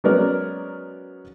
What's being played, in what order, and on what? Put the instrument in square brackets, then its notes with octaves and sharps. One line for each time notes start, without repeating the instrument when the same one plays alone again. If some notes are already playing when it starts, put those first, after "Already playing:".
[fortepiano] F#3 G#3 B3 C#4 A#4 D5